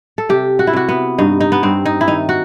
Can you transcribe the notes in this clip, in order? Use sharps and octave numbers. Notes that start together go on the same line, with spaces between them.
A4
C3 G4
F#4
E4
C3 F#4
B3
G2 D#4
D#4
B3
G2 C4
D#4
E4
D#3 D#4
F#4